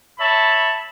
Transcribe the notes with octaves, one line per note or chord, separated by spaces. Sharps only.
C#5 E5 A5 B5